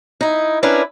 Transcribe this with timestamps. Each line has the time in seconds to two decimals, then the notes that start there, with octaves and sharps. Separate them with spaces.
0.21 D#4 E4
0.63 C#4 D4 E4 A#4 B4 D5